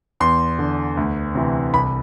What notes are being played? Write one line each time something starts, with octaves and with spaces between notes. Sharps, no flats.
E2 C6
D3
D2
C3 E3
C2 B5